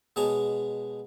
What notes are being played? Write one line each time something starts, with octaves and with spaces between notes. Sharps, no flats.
B2 G#3 G#4 C#5 A5 A#5